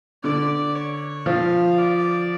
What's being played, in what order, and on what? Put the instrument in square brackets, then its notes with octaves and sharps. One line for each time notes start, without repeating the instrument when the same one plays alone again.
[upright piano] D3 [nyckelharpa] D5
[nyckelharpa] C#5
[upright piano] F3 [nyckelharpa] F5
[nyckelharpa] D5